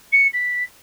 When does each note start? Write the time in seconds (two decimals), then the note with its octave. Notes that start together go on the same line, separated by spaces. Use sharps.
0.12 C#7
0.33 B6